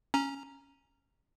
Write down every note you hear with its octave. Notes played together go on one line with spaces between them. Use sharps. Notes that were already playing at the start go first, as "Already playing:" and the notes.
C#4 A#5